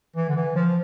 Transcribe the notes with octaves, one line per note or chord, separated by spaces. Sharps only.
E3
D3
E3
F3